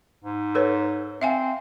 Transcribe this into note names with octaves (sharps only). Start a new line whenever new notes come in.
G#2
A4 B4 C#5
C4 E5 F5 G#5